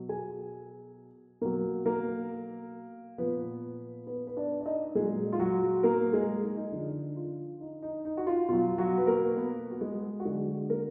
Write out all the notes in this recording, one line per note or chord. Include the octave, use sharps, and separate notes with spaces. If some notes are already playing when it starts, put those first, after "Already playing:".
Already playing: B2 F#3
G#4 G#5
B2 F#3 A#3 A#4
A#3 A#4
A#2 F3 B3 B4
B3 B4
B4
D4 D5
D5
D#4 D#5
A#2 F#3 G#3 G#4
F4
F#3 F#4
A#3 A#4
G#3 G#4
D#4
D#4
D3 F3 D#4
F4
D#4
D#4
D#4
F#4
F4
B2 F#3 F4
F#3 F#4
B4
A#3 A#4
B3 B4
F#4
G#3 G#4
F#4
D3 F#3 G#3 G#4
A#3 A#4